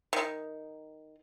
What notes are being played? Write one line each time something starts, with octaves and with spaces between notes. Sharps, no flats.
D#3